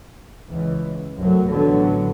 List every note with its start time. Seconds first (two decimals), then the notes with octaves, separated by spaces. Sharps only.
0.48 C#2 E3
1.17 C2 F#2 F#3 A3
1.47 A1 A2 D3 F#3 B3